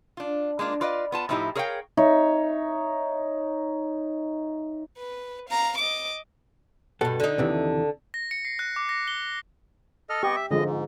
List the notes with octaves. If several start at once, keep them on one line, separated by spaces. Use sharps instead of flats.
D4 F4
G#3 A#3 D4 F4
F4 B4 D5 D#5 F5
B3 F4 A5
A2 F3 D#4 E4 G4
G#4 A#4 C#5 E5 F5 G5
D#4 C#5 E5
B4
F5 A#5
D#5 D6
G2 B2 F#4 A4
D3 D#4
D#2 C3 E3
A#6
C#7
C7
F#6
D6
A#6
G7
A4 D#5 F6
B3 G4 D#5 C#6
E5
F#2 D3 F3 G#3 D#5
G#2